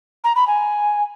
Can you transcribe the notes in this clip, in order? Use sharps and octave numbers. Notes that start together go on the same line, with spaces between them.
A#5
B5
G#5